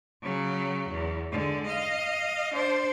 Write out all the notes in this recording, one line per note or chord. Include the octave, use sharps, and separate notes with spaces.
C#3 F#3
E2
D3 G#3
D#5 F5
D4 C5